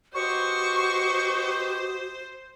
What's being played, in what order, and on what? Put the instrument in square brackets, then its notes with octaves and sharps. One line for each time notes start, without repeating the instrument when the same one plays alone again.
[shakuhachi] F#4 [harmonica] G4 B4 D#5 [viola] C5 [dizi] C#6